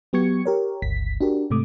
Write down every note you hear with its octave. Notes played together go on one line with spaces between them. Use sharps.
F#3 B3 G4 C#6 G#6 C#7
G4 A#4 C#5
G1 C#2 B6
D4 F#4 G4 A#4
G#2 C3 A3 D6 D#6